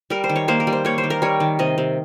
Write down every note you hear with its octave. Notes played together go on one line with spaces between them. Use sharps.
G3 A#4
C5
D#3
C#5
A#3 C5
A#4
G3
C5
A#3 C#5
C5
D#3
A#4
G3 C#5
D#3
C3 D#5
C3